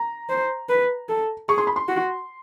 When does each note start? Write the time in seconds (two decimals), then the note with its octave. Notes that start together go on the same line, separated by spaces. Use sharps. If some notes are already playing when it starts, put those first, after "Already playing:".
Already playing: A#5
0.29 C5
0.69 B4
1.09 A4
1.49 G#4 C#6
1.58 C6
1.67 B5
1.76 C6
1.88 F#4